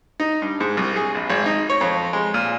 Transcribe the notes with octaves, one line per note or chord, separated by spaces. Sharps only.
D#4
G2
G#2
C2
G#4
A#1
G#1
D#4
C#5
F2
G#3
A#2